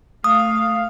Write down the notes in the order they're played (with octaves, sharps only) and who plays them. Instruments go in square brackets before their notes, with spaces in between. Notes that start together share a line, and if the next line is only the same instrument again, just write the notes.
[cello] A3 F5 [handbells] D#6